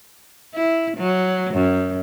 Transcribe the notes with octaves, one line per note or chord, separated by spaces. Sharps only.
E4
F#3
F#2